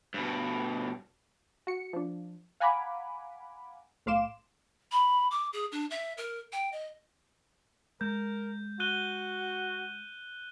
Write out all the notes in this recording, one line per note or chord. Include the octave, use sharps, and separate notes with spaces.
G2 B2
F#4 C#7
F3 D4
F5 F#5 G#5 A#5 B5 D6
B1 A2 F5 C6 D6 E7
B5
D6
G#4
D4
E5
A#4
G5
D#5
G#3 A#4 G6
F#4 F#6 D#7 G7